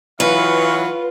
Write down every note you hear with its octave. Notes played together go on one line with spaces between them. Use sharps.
E3 F#3 F4 B4 F5 C#6